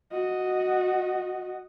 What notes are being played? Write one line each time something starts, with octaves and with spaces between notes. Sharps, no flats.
F#4 D#5